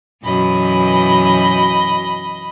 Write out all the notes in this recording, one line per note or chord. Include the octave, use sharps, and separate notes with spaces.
F#2 B2 E3 D#5 B5